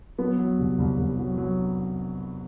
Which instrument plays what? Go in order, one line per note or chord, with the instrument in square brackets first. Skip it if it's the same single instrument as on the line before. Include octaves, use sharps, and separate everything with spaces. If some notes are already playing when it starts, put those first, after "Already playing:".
[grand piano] F#3 B3
F#3
C2
C2
C2
F#3
F#3